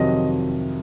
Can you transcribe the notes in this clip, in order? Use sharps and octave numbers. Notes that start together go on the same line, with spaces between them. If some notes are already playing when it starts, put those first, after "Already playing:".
Already playing: F2 C3 D#3 F#3 D#5